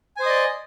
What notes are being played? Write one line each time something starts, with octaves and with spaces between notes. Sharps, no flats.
C5 D5 D#5 G#5 D#6